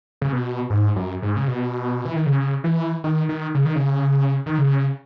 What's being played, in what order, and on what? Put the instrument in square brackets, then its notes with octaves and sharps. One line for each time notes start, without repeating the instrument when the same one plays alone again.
[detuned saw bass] C#3
B2
G#2
F#2
G#2
C#3
B2
E3
D#3
C#3
E3
D#3
D#3
C#3
D#3
C#3
D#3
C#3